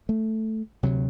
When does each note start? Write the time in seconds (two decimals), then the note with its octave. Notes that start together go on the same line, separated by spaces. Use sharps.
0.09 A3
0.83 D2 C3 F#3